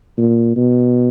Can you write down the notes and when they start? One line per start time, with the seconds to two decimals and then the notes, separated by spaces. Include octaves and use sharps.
0.18 A#2
0.56 B2